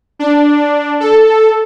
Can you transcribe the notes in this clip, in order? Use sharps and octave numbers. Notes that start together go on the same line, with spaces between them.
D4
A4